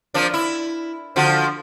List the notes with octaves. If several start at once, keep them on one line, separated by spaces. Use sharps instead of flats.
F3 A#3 D4
E4
D3 F3 F#4